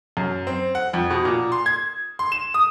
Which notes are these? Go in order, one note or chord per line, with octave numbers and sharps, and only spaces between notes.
F#2
C4
F#5
F2
B2
A#2
C6
G#6
C6
E7
D#6